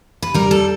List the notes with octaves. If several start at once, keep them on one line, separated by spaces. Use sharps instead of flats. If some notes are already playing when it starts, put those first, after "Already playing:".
B4
G3 A#4
A4